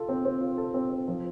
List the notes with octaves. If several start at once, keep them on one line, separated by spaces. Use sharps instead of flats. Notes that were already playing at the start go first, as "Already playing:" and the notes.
Already playing: F4 A4
C4
C4
F4
A4
C4
C4
F3